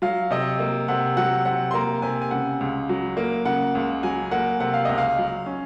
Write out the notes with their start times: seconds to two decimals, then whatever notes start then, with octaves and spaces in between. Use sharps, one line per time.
0.02 F#3 F5
0.31 C3 D#5
0.59 A#3
0.88 C3 F#5
1.17 F#3 F#5
1.45 C3 F#5
1.71 C6
1.74 A#3 A#5
2.02 C3 G#5
2.22 G#5
2.31 C#3 F#5
2.61 C#2
2.89 F#3
3.17 A#3
3.45 C#3 F#5
3.75 C#2
4.03 F#3 G#5
4.31 A#3 F#5
4.60 C3 F#5
4.74 F5
4.85 C#2 D#5
4.98 F5
5.18 F#3
5.46 C#4